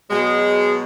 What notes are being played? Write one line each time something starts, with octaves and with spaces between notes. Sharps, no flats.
B2 F#3 G#3